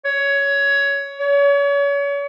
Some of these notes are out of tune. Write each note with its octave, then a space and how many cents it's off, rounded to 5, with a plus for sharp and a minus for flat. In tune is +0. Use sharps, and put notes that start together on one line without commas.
C#5 +15
C#5 +35